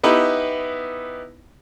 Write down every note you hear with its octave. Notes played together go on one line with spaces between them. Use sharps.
B3 D#4 E4 G4 B4